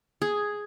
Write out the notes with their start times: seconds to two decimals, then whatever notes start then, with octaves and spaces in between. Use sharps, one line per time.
0.22 G#4